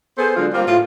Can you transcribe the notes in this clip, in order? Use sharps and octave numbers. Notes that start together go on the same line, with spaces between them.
B3 G#4 A4 C5
D3 F#3 G#3 D4 F4
G3 A#3 C4 F4
A2 F4